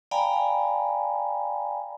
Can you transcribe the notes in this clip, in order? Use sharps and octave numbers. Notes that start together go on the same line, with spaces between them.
D5 F5 G5 G#5 A#5 B5